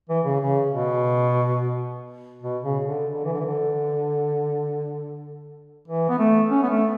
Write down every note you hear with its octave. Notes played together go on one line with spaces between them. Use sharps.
E3
C#3
C#3
B2
B2
C#3
D3
D3
E3
D3
E3
D3
E3
B3
A3
C#4
B3
A3